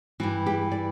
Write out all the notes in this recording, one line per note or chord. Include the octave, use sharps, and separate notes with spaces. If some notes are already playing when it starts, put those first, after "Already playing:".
G2 E3 F#4
G4
D5